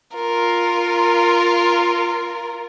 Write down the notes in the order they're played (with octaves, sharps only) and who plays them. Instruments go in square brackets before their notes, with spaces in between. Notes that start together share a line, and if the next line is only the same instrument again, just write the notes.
[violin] F4 A#4